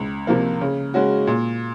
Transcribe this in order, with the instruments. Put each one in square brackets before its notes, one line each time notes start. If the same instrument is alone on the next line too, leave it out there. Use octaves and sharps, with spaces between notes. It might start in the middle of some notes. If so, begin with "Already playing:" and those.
Already playing: [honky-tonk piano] C#2
C3 F3 A#3
C#3
G#3 C#4 F#4
A#2